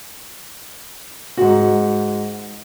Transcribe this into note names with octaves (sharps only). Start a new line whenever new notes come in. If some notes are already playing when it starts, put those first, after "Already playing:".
G#2 F#4